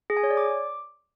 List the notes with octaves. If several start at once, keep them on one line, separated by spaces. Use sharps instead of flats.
G#4
G#5
C#5
D5
D6